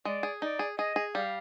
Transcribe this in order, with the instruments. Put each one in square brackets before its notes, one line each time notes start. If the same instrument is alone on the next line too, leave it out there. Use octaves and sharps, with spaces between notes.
[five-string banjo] G#3 [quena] D5
[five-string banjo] G#4
[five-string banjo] D#4 [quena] D5
[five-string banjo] G#4
[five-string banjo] G#4 [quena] D#5
[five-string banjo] G#4
[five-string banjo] G3 [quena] F5